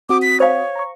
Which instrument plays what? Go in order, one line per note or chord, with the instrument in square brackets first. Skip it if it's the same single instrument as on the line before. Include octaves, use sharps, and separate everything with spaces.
[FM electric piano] C4 F#4 D#6 [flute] D6
[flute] B6
[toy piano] C5 F5 [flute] C#5
[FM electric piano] A#5 C#6